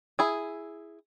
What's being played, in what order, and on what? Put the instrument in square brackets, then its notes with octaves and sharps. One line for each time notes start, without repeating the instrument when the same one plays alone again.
[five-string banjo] E4 G#4